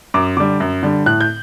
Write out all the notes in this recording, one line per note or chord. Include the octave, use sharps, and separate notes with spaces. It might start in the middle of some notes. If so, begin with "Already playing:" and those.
F#2 D6
D3 G3 D6
F#2
D3 G3
A2 F#6
G6